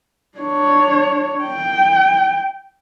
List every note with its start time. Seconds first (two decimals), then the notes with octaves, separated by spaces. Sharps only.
0.38 D4 C#5
1.43 G5